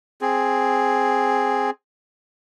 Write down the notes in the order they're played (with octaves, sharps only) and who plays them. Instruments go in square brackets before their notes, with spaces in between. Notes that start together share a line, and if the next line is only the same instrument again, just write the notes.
[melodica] C4 G#4